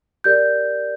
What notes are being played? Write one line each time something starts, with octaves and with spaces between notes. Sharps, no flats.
G4 A#4 D5 G6